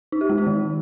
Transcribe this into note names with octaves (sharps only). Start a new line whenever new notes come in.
D#4
G4
G#3
D#4
D#3